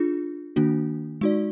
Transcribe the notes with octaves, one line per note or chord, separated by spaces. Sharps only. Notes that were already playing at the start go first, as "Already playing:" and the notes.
Already playing: D4 F4 G#4
D#3 A#3 D4 F#4
G#3 D#4 F#4 D5